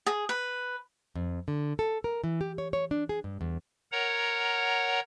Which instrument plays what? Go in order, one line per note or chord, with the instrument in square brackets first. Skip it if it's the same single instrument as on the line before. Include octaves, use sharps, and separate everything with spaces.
[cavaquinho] G#4
B4
[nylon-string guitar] F2
D3
A4
A#4
E3
G4
C#5
C#5
D4
G#4
G2
E2
[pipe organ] A#4 C#5 F#5 A#5